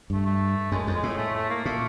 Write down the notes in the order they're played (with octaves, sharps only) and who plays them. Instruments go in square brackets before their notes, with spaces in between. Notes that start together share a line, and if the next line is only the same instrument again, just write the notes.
[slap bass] G2 [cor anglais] A3
[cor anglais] A3
[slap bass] F#2 [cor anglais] G#3
[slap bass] F2
[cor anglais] G#3
[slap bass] A2
[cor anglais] A3
A3
A#3
[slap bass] A#2 [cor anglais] A3